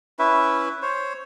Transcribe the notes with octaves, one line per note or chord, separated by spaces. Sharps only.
C#4 E4 B4 E5
C5 C#5